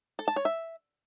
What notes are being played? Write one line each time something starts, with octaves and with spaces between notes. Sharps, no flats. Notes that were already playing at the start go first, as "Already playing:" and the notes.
A4
A5
C#5
E5